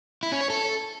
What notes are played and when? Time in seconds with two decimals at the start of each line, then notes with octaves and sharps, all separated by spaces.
0.23 E4
0.32 C#4
0.41 C#5
0.50 A4